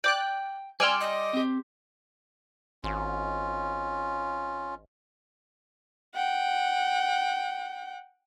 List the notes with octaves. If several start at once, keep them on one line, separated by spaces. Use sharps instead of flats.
D5 G5 D6 F#6
G3 D5 G5 G#5 C6 E6 F6
D#5
C4 G4
G#1 C#4 F4
F#5 G5